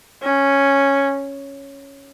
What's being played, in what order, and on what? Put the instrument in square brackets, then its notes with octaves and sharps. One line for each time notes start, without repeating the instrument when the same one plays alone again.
[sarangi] C#4